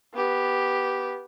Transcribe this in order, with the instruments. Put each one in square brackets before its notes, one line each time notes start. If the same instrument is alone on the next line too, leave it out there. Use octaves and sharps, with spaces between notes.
[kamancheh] B3 G4